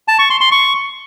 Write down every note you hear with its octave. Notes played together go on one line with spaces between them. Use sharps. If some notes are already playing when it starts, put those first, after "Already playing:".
A5
C#6
C6
C6
C#6